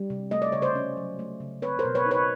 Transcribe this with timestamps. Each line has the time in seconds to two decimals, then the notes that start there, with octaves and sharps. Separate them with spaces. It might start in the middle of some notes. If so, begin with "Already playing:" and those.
Already playing: G3
0.10 C3
0.31 A3 D#5
0.42 D5
0.52 C#3 C#5
0.62 C5 D5
0.75 C#4
0.97 F#3
1.19 A3
1.40 C#3
1.62 C4 B4 C#5
1.79 A#4 C5
1.85 B2
1.95 B4 C#5
2.06 D#4
2.11 B4 C#5